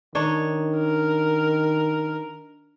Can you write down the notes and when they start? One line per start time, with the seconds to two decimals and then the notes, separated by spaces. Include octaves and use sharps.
0.15 D#3 D4 D#4 C#5
0.77 A#4